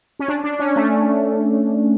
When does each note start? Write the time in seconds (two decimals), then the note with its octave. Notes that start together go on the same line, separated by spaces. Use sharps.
0.19 C#4
0.28 D4
0.44 D4
0.59 C#4
0.76 A3